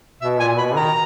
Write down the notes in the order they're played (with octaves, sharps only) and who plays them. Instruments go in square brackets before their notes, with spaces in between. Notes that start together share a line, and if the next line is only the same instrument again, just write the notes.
[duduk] B2 [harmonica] E5
[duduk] A#2 [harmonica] G#5
[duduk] B2 [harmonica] B5
[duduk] D#3 [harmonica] A#5